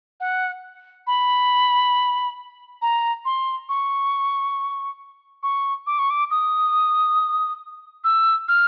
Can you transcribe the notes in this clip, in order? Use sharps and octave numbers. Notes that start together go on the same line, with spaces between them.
F#5
B5
A#5
C6
C#6
C#6
D6
C#6
D6
D#6
E6
F6